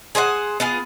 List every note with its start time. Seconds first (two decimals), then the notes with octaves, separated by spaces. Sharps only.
0.15 G#4 C5 D5 F#5
0.60 B3 F4 G#4